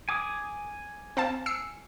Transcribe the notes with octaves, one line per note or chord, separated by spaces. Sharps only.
G#5 D6 D#6
C4 F5 A5
E6 C7 C#7